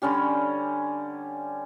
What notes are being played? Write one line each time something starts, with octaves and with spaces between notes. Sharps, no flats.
D3 G3 C#4 G4